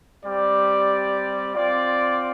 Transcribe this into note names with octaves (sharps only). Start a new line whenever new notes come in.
G3 C4 G4 D5
C4 F4 D5